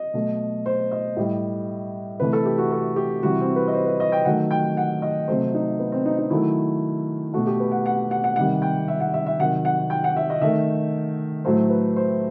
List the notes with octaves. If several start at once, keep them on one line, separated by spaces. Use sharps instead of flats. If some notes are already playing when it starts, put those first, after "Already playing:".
Already playing: D#5
B2 F#3 A3
C5
D#5
A2 G3
C3 E3 A3 B4
A4
G4
F#4
A4
G4
C3 E3 G3 F#4
C4
B4
D#5
C5
B4
D#5
G5
D#3 F#3 A3 F#5
G5
F#5
D#5
C3 F#3 A3 C5
D#4
B3
C4
D#4
D#4
D#3 F#3 A3 E4
B2 A3 F#4
G4
B4
F#5
F#5
F#5
F#5
C3 D#3 G3 F#5
G5
E5
F#5
E5
E5
C3 D#3 F#3 F#5
F#5
G5
F#5
E5
D#5
D#3 A3 E5
A2 F#3 A3 C5
B4
C5